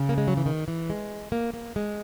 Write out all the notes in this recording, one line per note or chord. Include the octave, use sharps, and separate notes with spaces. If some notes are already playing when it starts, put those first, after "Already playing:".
Already playing: C#3
A#3
G#3
F#3
E3
D#3
E3
G#3
A#3
A#3
G#3